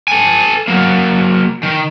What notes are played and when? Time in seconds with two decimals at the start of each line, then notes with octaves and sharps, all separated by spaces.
0.08 A4 G#5
0.68 F#3 A#3
1.63 D#3